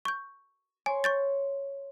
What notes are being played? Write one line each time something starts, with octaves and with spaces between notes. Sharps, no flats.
C#6 G6
C#5 G#5 C6
C#6 G6 A6